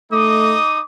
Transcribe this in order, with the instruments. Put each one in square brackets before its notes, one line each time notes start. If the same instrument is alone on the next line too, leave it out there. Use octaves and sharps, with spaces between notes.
[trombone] A3 [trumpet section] D#4 D#5 D#6 [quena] D6